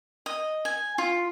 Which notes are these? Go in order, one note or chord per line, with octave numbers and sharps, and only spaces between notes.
D#5
G#5
F4